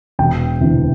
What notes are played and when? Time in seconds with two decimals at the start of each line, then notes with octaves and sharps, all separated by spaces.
0.19 E1 G5
0.61 D2 C3 E3